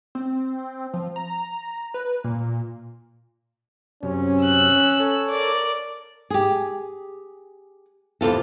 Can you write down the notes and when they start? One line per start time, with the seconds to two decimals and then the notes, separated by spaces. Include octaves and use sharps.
0.15 C4
0.94 F3
1.16 A#5
1.94 B4
2.24 A#2
4.03 F#2 C3 C#4
4.44 E6 F#6
5.00 A4 C#5
5.31 A#4 D5
6.30 G4 G#4
8.21 E2 C3 F4 A4